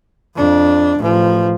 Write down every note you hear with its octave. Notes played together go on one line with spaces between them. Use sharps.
F2 D4
A1 F3